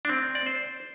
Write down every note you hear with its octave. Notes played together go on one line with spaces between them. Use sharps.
D4
C4
D5
C5